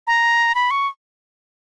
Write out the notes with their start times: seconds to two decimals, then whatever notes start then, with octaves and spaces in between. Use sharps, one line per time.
0.07 A#5
0.55 B5
0.71 C#6